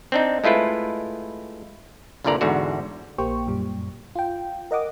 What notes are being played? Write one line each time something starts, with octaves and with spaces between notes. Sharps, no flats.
C4 D4 D#4
G#3 A3 E4 F4 B4
C2 G2 A#2 D3 D5 A#5
E2 G#2 D3 F#4
A#1 A#3 G4 C5 G5 C#6
F#2 A#2 G3
F4 G5
A#4 D#5 F#5 D6 D#6